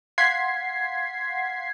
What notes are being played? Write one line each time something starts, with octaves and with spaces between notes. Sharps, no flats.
F5 F#5 C6 G#6 B6 C7